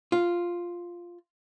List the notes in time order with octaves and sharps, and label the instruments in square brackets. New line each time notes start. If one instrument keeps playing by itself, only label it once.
[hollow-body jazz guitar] F4